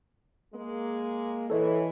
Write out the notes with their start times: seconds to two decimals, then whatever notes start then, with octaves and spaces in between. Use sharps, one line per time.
0.54 G#3 A#3
1.50 E3 A4 C#5 D#5